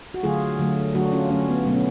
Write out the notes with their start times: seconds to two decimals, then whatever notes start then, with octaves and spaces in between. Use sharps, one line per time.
0.14 F#4
0.23 D3 F#3 A3 F4 G#4
0.59 D3 F#3 A3
0.95 D3 F#3 A3 D4 F#4
1.12 C#4 F4
1.30 D3 F#3 A3 C#4
1.48 B3
1.66 B2 F#3 A3 B3
1.74 C#4